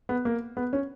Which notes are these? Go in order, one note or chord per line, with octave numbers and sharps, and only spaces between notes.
B3
A#3
B3
C#4